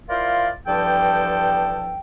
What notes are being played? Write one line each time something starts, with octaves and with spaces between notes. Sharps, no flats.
E4 F4 A#4 C5 D5 F5
E2 G2 F3 A4 G5